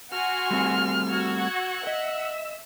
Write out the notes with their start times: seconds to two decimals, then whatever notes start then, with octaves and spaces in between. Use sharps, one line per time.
0.12 F#4 G#5 C6 F6
0.51 G3 A3 C4
1.09 F#4 E6 G#6
1.39 F#5
1.87 D#5 E5 E6